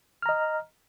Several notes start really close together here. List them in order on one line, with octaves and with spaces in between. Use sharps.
F6 A#5 D#5